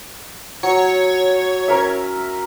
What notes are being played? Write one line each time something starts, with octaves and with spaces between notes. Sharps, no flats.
F#3 C#5
C#4 A#4 E5